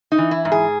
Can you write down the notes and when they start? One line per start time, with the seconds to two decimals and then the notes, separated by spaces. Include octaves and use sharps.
0.12 D#4
0.18 E3
0.31 E4
0.45 G#2
0.52 G#4